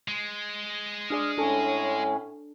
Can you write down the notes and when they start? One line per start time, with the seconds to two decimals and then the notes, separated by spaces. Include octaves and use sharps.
0.08 G#3
1.10 D4 G#4 D5 D#6 F6
1.38 A2 C#4 D4 A4